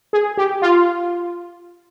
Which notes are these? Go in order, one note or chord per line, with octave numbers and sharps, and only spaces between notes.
G#4
G4
F4